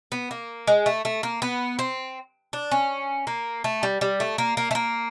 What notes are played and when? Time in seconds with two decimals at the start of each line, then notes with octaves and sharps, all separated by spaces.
0.12 B3
0.31 A#3
0.67 G#3
0.86 A3
1.05 A3
1.23 A#3
1.42 B3
1.79 C4
2.53 D4
2.71 C#4
3.27 A#3
3.64 A3
3.83 G3
4.01 G3
4.20 A3
4.38 A#3
4.57 A#3
4.71 A3
4.75 A#3